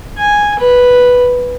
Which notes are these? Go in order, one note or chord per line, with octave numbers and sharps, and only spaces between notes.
G#5
B4